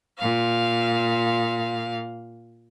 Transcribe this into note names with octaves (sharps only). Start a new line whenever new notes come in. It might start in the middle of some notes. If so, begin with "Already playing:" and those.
A#2 F5